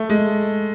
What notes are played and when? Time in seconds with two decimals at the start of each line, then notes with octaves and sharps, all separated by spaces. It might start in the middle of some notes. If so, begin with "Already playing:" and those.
Already playing: A3
0.10 G#3